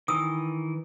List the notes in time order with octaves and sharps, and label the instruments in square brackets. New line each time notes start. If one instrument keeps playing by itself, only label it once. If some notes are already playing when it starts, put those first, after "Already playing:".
[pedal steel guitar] D#3 E3 [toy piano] D#6 E6